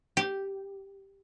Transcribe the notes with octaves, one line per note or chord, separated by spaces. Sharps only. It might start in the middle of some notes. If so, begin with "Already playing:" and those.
G4